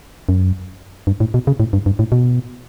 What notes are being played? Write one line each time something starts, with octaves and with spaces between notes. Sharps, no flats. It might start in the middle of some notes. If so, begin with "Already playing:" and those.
F#2
G2
A2
B2
C#3
A2
G2
G2
A2
B2